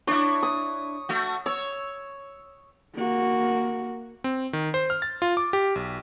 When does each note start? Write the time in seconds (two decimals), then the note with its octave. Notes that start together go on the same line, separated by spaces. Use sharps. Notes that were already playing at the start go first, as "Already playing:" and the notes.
0.07 D4 E4 C#5
0.43 D#6
1.09 A3 F#4
1.46 C#5 E6
2.95 A#3 F#4
4.24 C4
4.53 D#3
4.74 C5
4.90 F6
5.02 A6
5.22 F4
5.37 D6
5.53 G4
5.75 B1